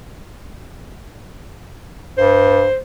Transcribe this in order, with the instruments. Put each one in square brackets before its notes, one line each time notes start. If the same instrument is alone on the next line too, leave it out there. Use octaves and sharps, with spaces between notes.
[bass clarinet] G2 [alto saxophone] C5